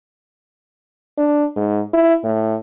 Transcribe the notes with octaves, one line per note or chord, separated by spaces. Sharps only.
D4
G#2
E4
A2